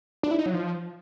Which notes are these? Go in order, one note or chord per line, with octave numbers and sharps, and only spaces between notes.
D4
E4
D#4
F#3
F3